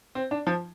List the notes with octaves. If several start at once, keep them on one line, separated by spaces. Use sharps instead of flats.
C4
D4
F3